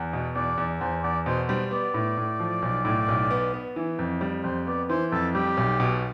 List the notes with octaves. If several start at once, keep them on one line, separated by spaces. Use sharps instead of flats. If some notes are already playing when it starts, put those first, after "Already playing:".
Already playing: E2
B2
E2 D5
E2
E2 C5
E2 D5
B2 C5
G3 C5
B3 D5
A2
A2
F3
B1
A2
B1
B3
B3
E3
F2
G3
F2 C5
B3 D5
E3 C5
F2 A4
G3 G4
B1
B2